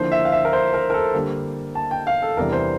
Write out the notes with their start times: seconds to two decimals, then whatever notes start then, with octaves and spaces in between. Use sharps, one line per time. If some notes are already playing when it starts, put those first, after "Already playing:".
Already playing: D3 F3 A#3 E4 C5
0.12 E5
0.25 F5
0.32 E5
0.45 A#4
0.53 C5
0.74 A#4
0.90 A#4
0.94 A4
1.15 D3 G3 A#3
1.75 A5
1.91 G5
2.07 F5
2.22 A4
2.37 E2 C3 E3 G3 D4 A#4
2.53 C5